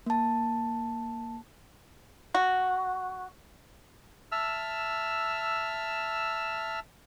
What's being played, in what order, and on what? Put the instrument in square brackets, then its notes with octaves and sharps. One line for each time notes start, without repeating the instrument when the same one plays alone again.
[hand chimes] A#3 A5
[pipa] F#4
[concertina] E5 A5 E6 F6